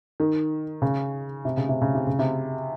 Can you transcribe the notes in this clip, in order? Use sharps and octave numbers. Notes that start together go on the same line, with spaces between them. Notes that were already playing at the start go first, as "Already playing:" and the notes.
D#3
C#3
C3
C#3
C3
C#3
C3
C#3
C3